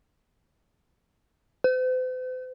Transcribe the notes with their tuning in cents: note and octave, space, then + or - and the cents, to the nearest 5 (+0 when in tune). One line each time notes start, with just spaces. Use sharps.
C5 -45